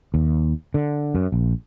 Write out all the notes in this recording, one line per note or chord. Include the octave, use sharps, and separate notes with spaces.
D#2
D3
F#2
A#1